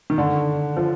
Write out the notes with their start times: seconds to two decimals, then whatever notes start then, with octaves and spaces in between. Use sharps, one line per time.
0.10 D#3
0.18 D3
0.77 F3